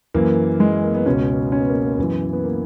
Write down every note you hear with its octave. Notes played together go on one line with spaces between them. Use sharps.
F#2 E3 A#3
G#3
A#3
B3
C#2 B2 C#4
C#4
B3
A#3
B3
F#2 E3
B3
A#3